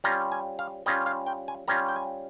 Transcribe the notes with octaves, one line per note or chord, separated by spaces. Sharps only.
G3 C#4 F4 A#5
G#5
F5
G3 C#4 F4 D#5
F5
G5
G#5
G3 C#4 F4 A#5
G5
G#5